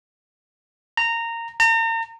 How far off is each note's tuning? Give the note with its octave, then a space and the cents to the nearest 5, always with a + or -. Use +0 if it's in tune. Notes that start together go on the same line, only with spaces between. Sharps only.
A#5 -15
A#5 -40